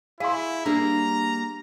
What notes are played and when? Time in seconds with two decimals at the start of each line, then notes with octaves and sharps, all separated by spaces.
0.20 E4 G#4 F5 C6
0.66 G3 A#3 D4 G#4 A#5